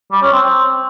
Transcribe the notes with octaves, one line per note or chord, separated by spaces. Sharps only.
G3
C#4
C4
C4